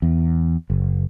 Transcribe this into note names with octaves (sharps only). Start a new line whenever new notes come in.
E2
F#1